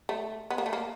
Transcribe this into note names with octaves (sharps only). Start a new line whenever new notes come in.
A3
B3
A#3
A3
A#3